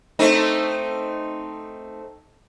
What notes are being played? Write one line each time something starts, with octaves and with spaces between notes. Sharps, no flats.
A3 C4 D#4